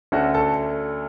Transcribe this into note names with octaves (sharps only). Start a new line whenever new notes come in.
D2 D3 A3 C#4 F#4
A4